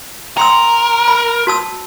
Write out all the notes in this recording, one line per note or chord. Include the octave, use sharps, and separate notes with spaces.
A#4 G5 C6 E6
B5
F#4 A5 E6